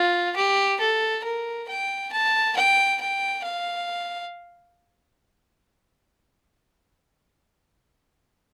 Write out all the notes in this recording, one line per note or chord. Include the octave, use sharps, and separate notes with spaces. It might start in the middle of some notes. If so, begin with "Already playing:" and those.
Already playing: F4
G4
A4
A#4
G5
A5
G5
G5
F5